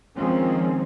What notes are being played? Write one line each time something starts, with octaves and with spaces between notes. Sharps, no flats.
D#3 F3 G#3 C4 C#4